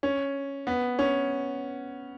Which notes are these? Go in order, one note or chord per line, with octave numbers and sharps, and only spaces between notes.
C#4
B3
C#4